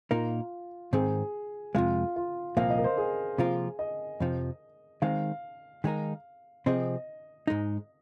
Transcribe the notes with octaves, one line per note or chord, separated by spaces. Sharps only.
A#2 A#3 D#4 F4 A#4
G#2 D#3 C4 G#4
F2 C3 G#3 F4
F4
C2 A#2 F3 A#3 F5
D#5
A#4
C5
G#4
C3 F3 A#3 F4 A#4
D#5
F2 C3 F3
D#3 G#3 C4 F5
D#3 G#3 D#4 A#4
C3 F3 C4 G#4 D#5
G#2 G#3 D#4